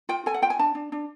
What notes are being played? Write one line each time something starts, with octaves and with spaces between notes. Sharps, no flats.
F4 G5
A4 G#5
F#5
F4 G5
G#5
D4 A5
D4
D4